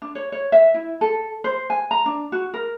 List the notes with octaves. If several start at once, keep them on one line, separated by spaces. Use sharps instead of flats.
D4
C#5
C#5
E5
E4
A4
C5
G#5
A#5
D4
F#4
A#4